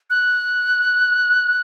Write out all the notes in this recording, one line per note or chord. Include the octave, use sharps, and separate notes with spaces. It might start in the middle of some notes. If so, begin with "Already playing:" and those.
F#6